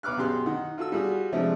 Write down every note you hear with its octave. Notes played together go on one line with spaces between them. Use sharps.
B1 B4 D6 F6 F#6
F#2 B2 G4 G#4 C6 F#6
D#3 D#4 F#5
F4 F#4 A4 E6
G3 F4 F#4 G#4
C3 F3 G#3 A3 D4